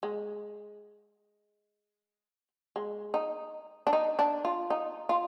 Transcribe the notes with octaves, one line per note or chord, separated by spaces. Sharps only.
G#3
G#3
D#4
D4
D#4
D4
F4
D#4
F4